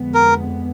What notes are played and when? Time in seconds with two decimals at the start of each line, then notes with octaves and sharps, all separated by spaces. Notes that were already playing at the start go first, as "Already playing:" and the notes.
Already playing: F2 D3 G#3 B3
0.14 A#4